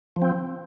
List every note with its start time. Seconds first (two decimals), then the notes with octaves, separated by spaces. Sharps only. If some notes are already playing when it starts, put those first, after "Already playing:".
0.16 F3
0.22 C4